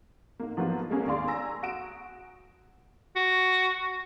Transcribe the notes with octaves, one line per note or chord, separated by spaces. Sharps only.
G#2 A#3
F3 F#3 A#3 B3 F4 F#4
G#3 A#3 C#4 G#4 A#4
D#2 G#4 D5 F5 C6 C#6
G#5 A#5 E6 A#6
F#4 D#6 D7 E7
F#4